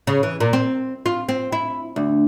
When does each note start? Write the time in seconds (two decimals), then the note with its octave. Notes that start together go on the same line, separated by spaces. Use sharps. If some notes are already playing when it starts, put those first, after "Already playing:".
0.07 C#3
0.23 E3
0.40 A#2
0.53 C4
1.06 F4
1.29 C4
1.52 E4
1.96 D2